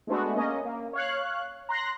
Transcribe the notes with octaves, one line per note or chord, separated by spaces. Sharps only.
G#3 A3 B3 D4 F#4
A#3 C#4 D#5
A#3
C#5 F5 F#6
A#5 C6 F#6 A#6